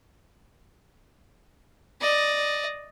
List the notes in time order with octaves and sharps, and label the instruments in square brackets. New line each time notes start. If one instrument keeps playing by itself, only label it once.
[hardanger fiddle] D5 D#5